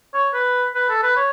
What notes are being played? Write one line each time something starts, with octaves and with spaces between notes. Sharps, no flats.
C#5
B4
B4
A4
B4
C#5